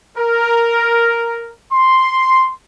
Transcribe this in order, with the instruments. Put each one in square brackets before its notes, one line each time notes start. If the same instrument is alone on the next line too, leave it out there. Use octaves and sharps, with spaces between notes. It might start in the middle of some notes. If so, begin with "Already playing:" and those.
[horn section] A#4
C6